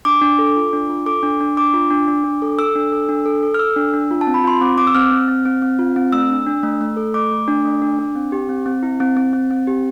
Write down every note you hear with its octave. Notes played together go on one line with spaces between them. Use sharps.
D4 D6
D4
A4
F4
D4
F4
A4 D6
D4
D4
D4 D6
F4
D4
D4
D4
A4
A4 E6
D4
A4
D4
A4
A4
F6
A4 E6
D4
D4
F4
A5
C4
B5
F4 C6
C4 D6
C4 D6
E6
C4 F6
C4
C4
C4
C4
F4
C4
A3 E6
D4
D4
A3
A3
A4
A3 D6
A3
D4
A3
D4
D4
C4
G4
C4
C4
E4
C4
C4
C4
C4
G4